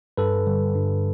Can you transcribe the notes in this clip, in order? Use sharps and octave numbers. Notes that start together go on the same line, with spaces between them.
G2 A4 B4
D3 G3
G2